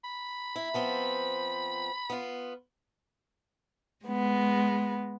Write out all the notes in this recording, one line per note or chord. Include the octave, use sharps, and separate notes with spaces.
B5
E4
F3 B3 C4
B3 F4
G#3 B3